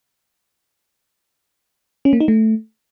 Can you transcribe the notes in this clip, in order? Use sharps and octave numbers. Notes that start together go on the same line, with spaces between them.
C#4
A#3
D#4
A3